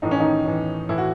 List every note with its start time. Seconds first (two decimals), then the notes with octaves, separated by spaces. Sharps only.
0.02 A2 E3 D#4
0.11 C#4
0.20 D#3 D#4
0.45 A2 E3
0.89 A2 E3 E4
0.98 F#4